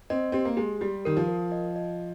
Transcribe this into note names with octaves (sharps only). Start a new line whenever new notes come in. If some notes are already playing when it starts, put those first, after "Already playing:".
C4 D#5
C4 G4
A#3
G#3 G4
G3 G4
D#3 A#4
F3
A#4
D#5
D#5